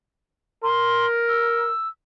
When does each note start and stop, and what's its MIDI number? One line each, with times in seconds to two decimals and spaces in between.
0.63 1.71 70
0.63 1.06 84
1.28 1.88 88